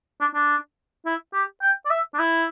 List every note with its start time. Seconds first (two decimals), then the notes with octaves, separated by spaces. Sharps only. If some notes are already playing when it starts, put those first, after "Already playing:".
0.20 D4
0.34 D4
1.05 E4
1.33 G4
1.62 G5
1.85 D5
1.90 E5
2.14 D4
2.19 E4